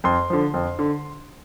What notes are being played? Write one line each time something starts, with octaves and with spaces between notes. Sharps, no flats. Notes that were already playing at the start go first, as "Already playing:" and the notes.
F2 C6
D3 F3
F2
D3